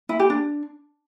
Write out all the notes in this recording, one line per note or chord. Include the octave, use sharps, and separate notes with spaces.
E4
G4
D4